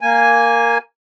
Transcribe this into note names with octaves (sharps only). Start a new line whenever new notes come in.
A#3 G#5